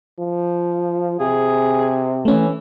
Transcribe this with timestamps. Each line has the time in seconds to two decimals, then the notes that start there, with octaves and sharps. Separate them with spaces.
0.19 F3
1.20 C3 G#4
2.25 E3 A3 C#4